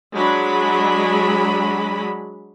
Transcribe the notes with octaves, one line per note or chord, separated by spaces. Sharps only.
F#3 G#3 D4 B5